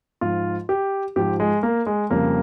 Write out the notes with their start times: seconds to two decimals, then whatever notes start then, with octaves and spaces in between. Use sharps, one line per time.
0.21 G#2 F3 F4
0.69 G4
1.16 G#2 F3 G4
1.40 G#3
1.63 A#3
1.86 G#3
2.10 F2 C#3 G3 A#3